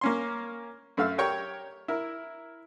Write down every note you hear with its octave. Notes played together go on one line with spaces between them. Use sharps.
A#3 C#4 C6
F#2 A3 F5 E6
G4 A#4 C#5 G5 C#6
E4 A#4